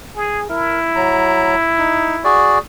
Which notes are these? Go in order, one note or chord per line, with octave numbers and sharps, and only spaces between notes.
G#4
E4 A#4
F#3 A#5
D#4
F#4 G#4 D5